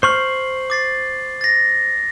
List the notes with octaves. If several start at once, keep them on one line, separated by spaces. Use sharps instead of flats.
C5 C#6 F6 C7 F#7
D6 A6 C7
A6 A#6